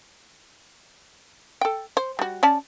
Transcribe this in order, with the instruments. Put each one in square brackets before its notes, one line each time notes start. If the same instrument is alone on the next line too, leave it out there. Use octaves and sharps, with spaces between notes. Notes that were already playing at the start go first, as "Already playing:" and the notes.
[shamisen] A4 G5
C5
G3 F#4
C#4 D5 A5